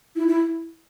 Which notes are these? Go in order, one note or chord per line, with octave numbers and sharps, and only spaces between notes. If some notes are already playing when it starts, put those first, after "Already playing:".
E4
E4